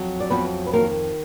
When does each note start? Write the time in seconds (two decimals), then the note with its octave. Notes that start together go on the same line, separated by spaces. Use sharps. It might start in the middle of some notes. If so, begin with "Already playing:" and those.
Already playing: F2 F#3
0.20 D5
0.30 F2 B3 B4
0.66 B4
0.73 D#3 A#3 A#4